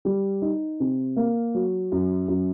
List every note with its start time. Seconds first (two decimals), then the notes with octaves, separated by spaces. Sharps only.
0.05 G3
0.42 D#4
0.80 C3
1.16 A#3
1.55 F#3
1.92 F#2
2.28 F#2